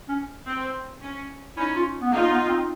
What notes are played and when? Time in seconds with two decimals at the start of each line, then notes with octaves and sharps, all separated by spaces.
0.09 C#4
0.46 C4
1.01 C#4
1.57 C#4 D#4 E4
1.76 F4
2.01 B3
2.12 A#3 D#4 F4
2.30 B3
2.49 C4